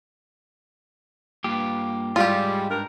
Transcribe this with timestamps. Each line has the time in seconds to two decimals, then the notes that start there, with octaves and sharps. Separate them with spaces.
1.44 G2 A#3 F4 G4 B4
2.16 G#2 G3 G#3 F4 G4 G#4 F5
2.70 G2 A#4